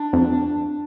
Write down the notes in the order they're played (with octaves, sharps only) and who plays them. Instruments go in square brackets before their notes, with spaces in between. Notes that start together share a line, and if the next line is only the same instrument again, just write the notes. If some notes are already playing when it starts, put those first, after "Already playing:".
Already playing: [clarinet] D4
[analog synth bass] F2